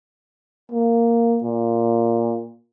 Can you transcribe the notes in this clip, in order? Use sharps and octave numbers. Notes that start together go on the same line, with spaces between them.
A#3
A#2